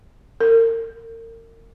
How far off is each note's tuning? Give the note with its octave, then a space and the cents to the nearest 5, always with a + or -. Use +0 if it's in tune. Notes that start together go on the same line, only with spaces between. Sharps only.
A#4 -35